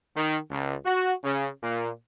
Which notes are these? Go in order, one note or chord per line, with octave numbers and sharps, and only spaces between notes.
D#3
C#2
F#4
C#3
A#2